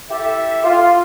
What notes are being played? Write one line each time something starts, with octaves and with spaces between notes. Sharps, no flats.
E4 G4 A4 E5
F4